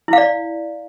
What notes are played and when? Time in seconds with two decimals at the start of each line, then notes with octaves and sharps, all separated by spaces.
0.08 E4
0.13 F5
0.18 D5